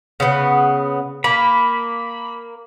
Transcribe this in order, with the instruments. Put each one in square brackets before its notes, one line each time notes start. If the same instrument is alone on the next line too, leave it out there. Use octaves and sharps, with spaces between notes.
[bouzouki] C#3 B3
[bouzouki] A#3 [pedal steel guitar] B5